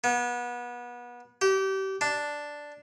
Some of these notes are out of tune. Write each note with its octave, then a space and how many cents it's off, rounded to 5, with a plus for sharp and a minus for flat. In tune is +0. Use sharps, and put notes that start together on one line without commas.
B3 -30
G4 -30
D4 +0